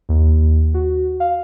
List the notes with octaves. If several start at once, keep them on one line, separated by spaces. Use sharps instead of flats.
D#2
F#4
F5